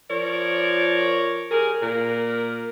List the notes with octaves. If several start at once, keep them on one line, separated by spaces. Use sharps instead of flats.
F3 A#4 C#5 D5
G4 G#4 A#4
A#2 A#4